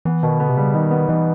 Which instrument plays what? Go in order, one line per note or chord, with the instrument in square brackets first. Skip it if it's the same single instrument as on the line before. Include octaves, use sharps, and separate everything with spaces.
[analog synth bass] E3 [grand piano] B3
[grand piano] B2 [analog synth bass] D#3
[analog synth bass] D3 [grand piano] B3
[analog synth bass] C3
[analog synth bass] C#3 [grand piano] G3
[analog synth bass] D#3 [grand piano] D#4
[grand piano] B3
[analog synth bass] E3 [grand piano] D#4